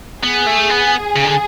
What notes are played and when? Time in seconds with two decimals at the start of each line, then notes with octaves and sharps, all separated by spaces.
0.23 B3 G#4
0.47 A3
0.70 B3
1.16 C#3
1.25 D3